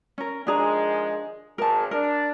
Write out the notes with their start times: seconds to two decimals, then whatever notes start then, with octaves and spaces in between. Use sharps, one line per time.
0.18 C#4 A#4
0.47 D#3 F3 G#3 D4 G#4 A#5
1.58 G#1 G#4 A#4 A5
1.91 D4 A#4